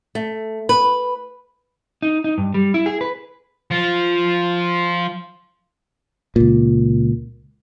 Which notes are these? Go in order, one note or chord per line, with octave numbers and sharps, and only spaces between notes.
A3
B4
D#4
D#4
G2
G3
E4
G#4
B4
F3 F4
C#2 A#2